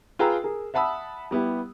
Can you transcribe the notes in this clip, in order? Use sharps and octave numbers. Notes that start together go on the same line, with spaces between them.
F4 G#4 B4 G5 A#5 E6
G#4 A#4
E5 F#5 A5 B5 D#6 E6
G3 B3 E4 G4